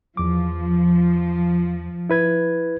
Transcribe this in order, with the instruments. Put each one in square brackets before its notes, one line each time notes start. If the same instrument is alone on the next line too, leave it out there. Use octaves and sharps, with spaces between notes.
[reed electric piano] E2 D6 [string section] F3
[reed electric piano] E4 B4 G#6